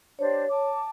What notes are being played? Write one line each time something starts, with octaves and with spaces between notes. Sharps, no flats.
D4 G4 C5 C#5
A5 D6